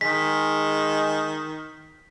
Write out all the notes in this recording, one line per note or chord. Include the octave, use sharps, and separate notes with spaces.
D#3 G#3 B6